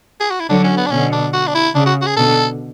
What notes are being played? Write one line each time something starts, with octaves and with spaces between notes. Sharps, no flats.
G#4
F#4
E4
D3 F#3 D4
C#4
B3
D4
B2 D3 C#4
D4
F#4
D4
E4
C#3 D4
F#4
F#4
G#4
B2 D3 A4